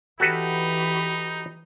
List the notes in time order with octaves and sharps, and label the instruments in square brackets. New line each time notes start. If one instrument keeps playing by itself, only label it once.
[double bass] E3 [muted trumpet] D#4 [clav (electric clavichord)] F#4 A4 B4 [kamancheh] G4 B5